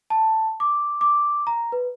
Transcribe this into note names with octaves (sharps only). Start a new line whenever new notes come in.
A5
D6
D6
A#5
B4